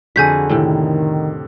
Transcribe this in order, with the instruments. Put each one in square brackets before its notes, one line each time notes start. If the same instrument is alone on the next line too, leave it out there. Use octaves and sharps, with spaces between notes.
[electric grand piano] F2 D3 [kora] F#4 G#4 [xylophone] G#5 G6 B6
[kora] A2 C3 [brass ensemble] D#3